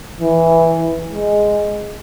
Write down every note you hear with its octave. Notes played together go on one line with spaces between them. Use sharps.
E3
G#3